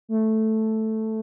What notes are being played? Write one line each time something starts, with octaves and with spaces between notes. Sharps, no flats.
A3